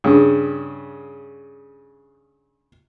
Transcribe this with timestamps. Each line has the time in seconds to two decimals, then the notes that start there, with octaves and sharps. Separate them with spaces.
0.04 G2 C#3